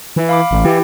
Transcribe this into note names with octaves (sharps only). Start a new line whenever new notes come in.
E3
F5 B5 D6
A1
E3 E4 G4 G5